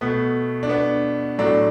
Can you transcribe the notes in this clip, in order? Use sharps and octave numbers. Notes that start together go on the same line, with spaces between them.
B2 A3 B3
D4
B3
A2 F#3 A3 D4